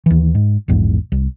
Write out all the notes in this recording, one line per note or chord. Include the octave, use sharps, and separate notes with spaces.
D#2 E3
G#2
A#1 E2 G#2
C2